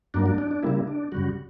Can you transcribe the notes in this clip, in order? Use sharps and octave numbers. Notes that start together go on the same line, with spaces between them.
G2 F#3 A#3 D4
D4
D4
D4
C#3 G3 A#3 E4
D4
F#2 C#3 G3 F#4